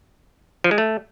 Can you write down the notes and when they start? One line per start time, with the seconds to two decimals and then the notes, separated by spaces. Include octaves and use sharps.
0.64 F3
0.71 G#3
0.78 A3